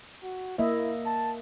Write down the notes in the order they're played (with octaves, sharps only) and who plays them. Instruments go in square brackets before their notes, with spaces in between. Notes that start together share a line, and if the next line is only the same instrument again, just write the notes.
[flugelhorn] F#4
[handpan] A#3 D#5 E5 [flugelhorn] E4
[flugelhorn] A5